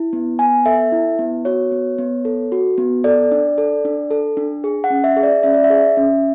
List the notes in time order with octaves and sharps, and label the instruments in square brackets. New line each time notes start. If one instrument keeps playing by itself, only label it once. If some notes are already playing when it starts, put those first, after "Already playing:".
Already playing: [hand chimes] E4
B3
B3 G#5
A4 E5
E4
B3
F#4 C#5
B3
B3
A4
F#4
B3
A4 D5
D4
A4
D4
A4
D4
G#4
F#5
C#4
E5
G#4
D5
C#4 E5
D5
E5
G#4
C#4